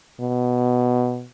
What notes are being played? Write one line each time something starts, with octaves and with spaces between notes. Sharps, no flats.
B2